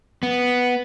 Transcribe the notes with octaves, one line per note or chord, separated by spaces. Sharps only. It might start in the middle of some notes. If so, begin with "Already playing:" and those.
B3